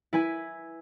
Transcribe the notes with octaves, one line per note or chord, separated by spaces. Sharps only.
E4 B4 G#5